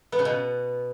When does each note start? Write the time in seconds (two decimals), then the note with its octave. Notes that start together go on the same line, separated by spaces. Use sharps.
0.12 B3
0.19 C#3
0.25 B2